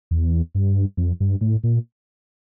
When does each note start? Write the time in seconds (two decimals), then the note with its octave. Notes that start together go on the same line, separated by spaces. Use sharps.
0.11 E2
0.55 G2
0.97 F2
1.20 G2
1.41 A2
1.63 A#2